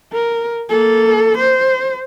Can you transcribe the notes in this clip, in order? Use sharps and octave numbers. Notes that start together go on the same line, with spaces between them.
A#4
A#3 A4
C5